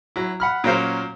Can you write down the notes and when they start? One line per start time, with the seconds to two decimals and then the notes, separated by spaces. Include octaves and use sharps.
0.16 F#3 E4
0.40 F#5 B5 F6
0.64 A#2 F#3 A#3 C#4 C5 F5